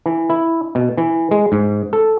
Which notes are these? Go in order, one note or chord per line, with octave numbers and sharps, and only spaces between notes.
E3
E4
B2
E3
G#3
G#2
A4